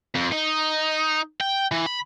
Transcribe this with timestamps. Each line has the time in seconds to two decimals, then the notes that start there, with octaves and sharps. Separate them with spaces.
0.15 F2
0.32 D#4
1.40 G5
1.71 E3
1.86 B5